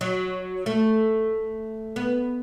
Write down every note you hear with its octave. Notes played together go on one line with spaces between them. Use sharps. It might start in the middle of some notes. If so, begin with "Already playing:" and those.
F#3
A3
B3